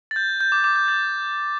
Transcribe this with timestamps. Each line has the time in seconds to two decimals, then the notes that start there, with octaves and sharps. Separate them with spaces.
0.11 A6
0.16 G6
0.40 G6
0.52 D6
0.64 D6
0.76 G6
0.88 A6